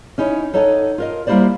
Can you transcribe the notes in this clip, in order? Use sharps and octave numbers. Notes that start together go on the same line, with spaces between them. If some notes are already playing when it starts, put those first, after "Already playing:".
C#4 D#4 E4 C#5
D#4 A4 C#5 D#5 F#5 A5
F4 A#4 D#5
G3 A#3 E4 G4 C5 D5